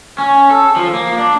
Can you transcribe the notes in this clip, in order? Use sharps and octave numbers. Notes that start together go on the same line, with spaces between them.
C#4
A4
F3
A#3
D4